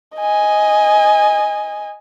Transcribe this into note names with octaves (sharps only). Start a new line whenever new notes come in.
D#5 G#5